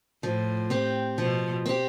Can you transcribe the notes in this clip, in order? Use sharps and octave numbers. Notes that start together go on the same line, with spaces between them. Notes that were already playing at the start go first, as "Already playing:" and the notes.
A2 F3
C4 G4
B2 F3
C4 G4